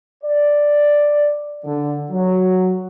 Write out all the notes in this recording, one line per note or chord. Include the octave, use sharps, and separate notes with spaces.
D5
D3
F#3